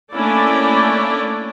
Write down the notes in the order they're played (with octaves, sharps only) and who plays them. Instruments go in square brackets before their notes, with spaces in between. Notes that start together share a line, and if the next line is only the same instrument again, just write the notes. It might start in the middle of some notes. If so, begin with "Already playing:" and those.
[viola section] A3 A#3 C#4 D4 E4 D5